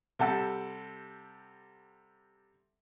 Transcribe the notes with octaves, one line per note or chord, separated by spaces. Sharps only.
C3 G3 A4 F#5 A5 E6